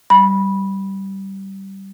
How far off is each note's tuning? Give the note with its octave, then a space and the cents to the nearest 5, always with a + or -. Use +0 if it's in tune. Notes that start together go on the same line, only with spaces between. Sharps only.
G3 -15 B5 -15